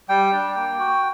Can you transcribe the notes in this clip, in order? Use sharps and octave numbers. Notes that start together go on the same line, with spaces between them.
G3 G5
D4
A#3
F#4